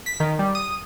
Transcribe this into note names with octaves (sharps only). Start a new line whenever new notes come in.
B6
D#3
G3
D#6